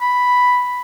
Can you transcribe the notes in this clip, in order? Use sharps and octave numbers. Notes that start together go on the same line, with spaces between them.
B5